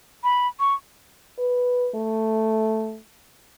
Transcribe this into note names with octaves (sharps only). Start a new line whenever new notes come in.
B5
C#6
B4
A3